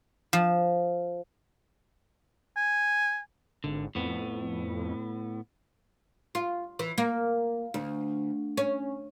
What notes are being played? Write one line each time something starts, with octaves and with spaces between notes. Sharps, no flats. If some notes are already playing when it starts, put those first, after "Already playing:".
F3
G#5
G#1 D3
F2 A2 B3
F4
E3
A#3
D2
C#4